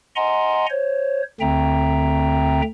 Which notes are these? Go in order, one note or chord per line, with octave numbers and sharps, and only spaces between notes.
D#5 F#5 G#5 A#5 C6
C5 C#5
D2 D3 C4 E5 G5 A#5